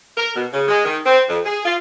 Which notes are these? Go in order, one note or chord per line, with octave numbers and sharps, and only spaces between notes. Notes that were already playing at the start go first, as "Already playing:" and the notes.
A#4
B2
C#3
G#3
D#3
C4
F2
G#4
F4